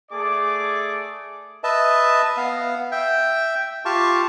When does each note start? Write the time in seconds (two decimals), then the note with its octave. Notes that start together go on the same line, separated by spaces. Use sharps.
0.11 A3 G#4 D5 D6
1.64 B4 D#5 E5 A5
2.37 B3 F5
2.92 E5 G5
3.85 F4 G4 F5 A5 C#6